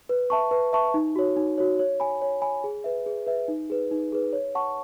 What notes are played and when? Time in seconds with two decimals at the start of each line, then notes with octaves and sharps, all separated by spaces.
0.09 B4
0.30 E5 A5 C#6
0.51 B4
0.73 E5 A5 C#6
0.94 D#4
1.16 F#4 C#5
1.36 D#4
1.58 F#4 C#5
1.79 C#5
2.00 G#5 B5
2.22 C#5
2.42 G#5 B5
2.64 G#4
2.84 B4 E5
3.06 G#4
3.27 B4 E5
3.48 D#4
3.70 G#4 B4
3.91 D#4
4.12 G#4 B4
4.33 C#5
4.55 F#5 A5 C#6